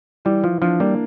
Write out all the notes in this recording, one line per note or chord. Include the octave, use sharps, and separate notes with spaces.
E3 G3
E3 F3
F3 D4
G3 A#3